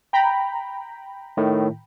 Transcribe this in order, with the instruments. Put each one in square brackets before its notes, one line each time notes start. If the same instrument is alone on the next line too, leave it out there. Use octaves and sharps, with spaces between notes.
[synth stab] G5 A#5 B5
[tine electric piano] A2 D#3